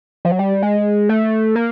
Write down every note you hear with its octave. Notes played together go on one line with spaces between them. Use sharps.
F3
F#3
G3
G#3
A3
A#3